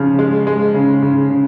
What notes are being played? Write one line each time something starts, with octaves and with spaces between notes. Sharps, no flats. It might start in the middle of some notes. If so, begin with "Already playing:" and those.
Already playing: C#3 F3
G#3
G#3
C#3
C#3
C#3